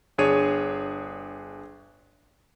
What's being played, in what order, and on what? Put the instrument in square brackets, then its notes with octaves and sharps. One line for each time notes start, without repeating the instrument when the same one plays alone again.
[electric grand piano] G1 D4 G#4 C#5 D#7